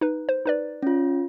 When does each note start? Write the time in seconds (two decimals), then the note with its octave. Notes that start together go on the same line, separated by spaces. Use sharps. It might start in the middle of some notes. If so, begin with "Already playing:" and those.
0.01 D#4 B4
0.29 C5
0.46 D#4 B4 D5
0.82 C#4 F4